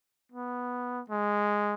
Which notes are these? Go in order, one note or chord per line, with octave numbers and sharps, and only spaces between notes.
B3
G#3